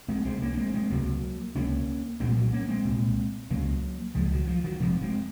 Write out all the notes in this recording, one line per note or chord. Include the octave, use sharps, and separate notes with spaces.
G#3 C4
C2 C3 G#3 C4
A#3 C#4
C#4
G#3 C4
G#3 C4
C#2 C3 F#3 A#3
C#2 C3 A#3 C#4
C2 A#2 G#3 C4
F#3 A#3
A#3 C#4
G#3 C4
C2 A#2
C#2 C#3 F#3 A#3
C#2 C#3 F3 G#3
D#3 F#3
F3
D#3 F#3
F1 F2 C3 F3 G#3
G#3 C4